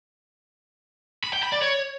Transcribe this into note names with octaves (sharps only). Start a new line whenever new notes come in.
B5
G5
B5
D5
C#5